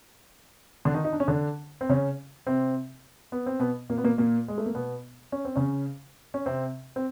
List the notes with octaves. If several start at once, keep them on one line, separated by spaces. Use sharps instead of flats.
D3 D4
D#3 D#4
D#4
D4
C#4
D3 D4
C4
C#3 C#4
C3 C4
B3
C4
B2 B3
A#2 A#3
B3
A#2 A#3
A#2 A#3
G#3
A3
A#3
B2 B3
C#4
C4
C#3 C#4
C#4
C3 C4
C4